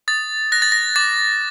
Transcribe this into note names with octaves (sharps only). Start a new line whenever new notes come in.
D#6 A6
F#6 A#6
A6
A#6
D6 A6